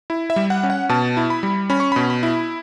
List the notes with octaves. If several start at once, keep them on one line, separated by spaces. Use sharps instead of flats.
E4
E5
G3
F#5
C#4
F#5
B2 A5
E4
B5
G3
C#4 B5
C#6
B2 B5
B5
E4